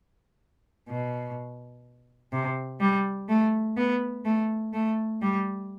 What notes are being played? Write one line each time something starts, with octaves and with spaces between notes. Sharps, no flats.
B2
C3
G3
A3
B3
A3
A3
G3